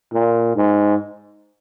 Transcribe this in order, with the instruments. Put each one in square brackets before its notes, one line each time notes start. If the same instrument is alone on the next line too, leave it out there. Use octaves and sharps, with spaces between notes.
[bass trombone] A#2
G#2